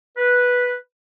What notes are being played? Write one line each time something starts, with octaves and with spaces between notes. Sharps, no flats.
B4